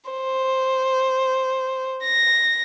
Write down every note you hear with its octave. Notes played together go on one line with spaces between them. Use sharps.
C5
A#6